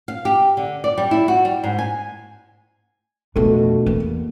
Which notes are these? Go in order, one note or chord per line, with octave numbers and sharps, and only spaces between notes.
F5
G4
D3
D5
G3
E4
F#4
G3
G#2
G#5
F2 B2 A3 D4
E2 A#3